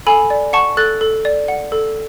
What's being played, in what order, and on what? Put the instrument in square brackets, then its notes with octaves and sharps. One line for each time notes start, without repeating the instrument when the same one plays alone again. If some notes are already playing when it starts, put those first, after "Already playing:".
[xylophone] A4 G#5 B5
D5
F#5 A5 C#6
A4 F#6 A6
A4
D5
F#5
A4